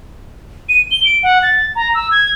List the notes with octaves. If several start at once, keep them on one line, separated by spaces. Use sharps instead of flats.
D#7
G7
D7
F#5
A6
A#5
E6
G#6